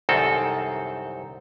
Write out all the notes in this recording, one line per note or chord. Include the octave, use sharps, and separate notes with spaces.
C2 F#2 D#3 C4 A4